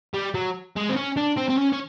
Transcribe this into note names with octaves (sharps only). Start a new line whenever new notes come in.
G3
F#3
G#3
C4
C#4
D4
C4
C4
C#4
C#4